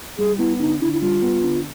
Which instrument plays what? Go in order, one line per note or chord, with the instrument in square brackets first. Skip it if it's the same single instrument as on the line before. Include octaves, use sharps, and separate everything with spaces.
[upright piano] G3 [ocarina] G#4
[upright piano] B3 [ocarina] E4
[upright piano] D3 [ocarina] D#4
[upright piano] D3 [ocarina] E4
[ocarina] E4
[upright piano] G3 [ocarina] F4
[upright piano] B3
D3